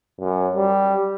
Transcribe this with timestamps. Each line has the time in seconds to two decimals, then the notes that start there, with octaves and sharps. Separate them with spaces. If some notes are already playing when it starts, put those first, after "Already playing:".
0.20 F#2
0.55 G3